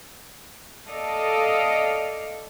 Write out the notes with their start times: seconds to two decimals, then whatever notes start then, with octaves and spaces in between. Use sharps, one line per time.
0.87 A4 D5 D#5 F5